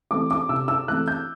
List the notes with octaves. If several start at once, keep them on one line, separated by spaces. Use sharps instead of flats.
E3 A3 C4 D6
D6
C3 E6
E6
E3 A3 C4 F#6
G6